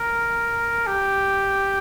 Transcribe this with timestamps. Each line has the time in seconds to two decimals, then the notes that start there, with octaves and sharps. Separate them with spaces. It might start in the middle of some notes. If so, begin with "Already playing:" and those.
Already playing: A#4
0.87 G4